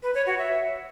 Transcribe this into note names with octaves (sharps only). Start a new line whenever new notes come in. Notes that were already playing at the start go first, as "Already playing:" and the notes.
B4
C#5
F#4
E5